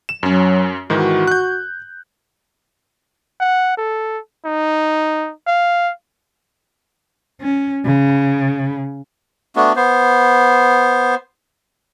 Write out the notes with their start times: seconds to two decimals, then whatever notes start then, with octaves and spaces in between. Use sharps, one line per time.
0.09 E7
0.23 F#2 F#3 C#4
0.90 G#2 D#3 E3 F#4
1.27 F#6 G6
3.40 F#5
3.77 A4
4.45 D#4
5.47 F5
7.41 C#4
7.85 C#3
9.56 A3 B3 D4 F#4
9.76 B3 C5